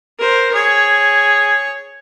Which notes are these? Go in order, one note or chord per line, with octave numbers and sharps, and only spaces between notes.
A#4 C5
G#4 C#5